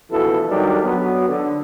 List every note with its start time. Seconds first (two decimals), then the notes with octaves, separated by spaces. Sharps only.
0.10 D2 B2 E3 F3 E4 A4
0.48 D#3 F#3 G3 D4 G4 A4
0.83 F#3 B3
1.28 D3